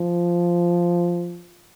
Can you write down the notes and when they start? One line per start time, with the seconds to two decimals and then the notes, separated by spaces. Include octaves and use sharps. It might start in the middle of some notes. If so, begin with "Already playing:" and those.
Already playing: F3